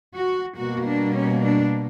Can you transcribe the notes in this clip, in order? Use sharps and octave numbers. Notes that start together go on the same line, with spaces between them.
F#4
B2 G3 A#3 F#4
D4
C#4
D4